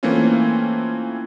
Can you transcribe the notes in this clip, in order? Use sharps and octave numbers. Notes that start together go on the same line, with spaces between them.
E3 A3 A#3 C4 C#4 F4